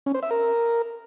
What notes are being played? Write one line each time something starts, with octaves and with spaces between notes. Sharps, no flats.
C#4
C5
E5
A#4